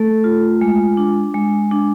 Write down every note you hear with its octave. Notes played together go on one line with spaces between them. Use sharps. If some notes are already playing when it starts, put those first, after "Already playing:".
Already playing: A3 A4
F4
G#3
D4
G#3
D4